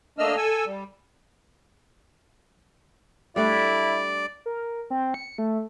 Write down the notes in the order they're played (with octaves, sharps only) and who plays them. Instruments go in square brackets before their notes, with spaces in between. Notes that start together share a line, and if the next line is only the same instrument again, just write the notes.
[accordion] A3 A#3 D4 D#5 E6 F6
A4 G#5 E6
G3
[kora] G3 A3 D4 [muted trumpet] E4 [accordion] D5
[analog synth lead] A#4
C4
C#7
A3